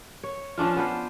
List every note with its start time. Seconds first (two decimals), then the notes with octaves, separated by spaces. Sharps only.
0.23 C#5
0.58 F3 C#4 D4 F4
0.76 B3 D4 C5